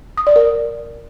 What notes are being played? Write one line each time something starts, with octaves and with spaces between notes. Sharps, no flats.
D#6
D5
A#4